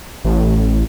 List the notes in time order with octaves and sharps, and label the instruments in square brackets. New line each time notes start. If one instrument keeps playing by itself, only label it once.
[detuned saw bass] A1